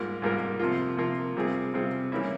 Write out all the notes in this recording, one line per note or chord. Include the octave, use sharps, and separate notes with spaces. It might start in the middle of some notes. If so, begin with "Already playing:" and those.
Already playing: G#2 G3 A#3 F4 A#4
G#2 G3 A#3 F4 A#4
C3 F3 A#3 F4
C3 F3 A#3 F4
C3 G3 C4 F4 G#4
C3 G3 C4 F4 G#4
E3 G3 A#3 C#4 E4